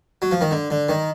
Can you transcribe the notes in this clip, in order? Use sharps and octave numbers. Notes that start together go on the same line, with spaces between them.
F#3
F3
D#3
D3
D3
D#3